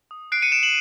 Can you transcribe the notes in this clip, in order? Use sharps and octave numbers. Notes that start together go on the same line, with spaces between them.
D#6
F#6 C7 D7
C#7 D#7
F#6 D7 E7
E7 F#7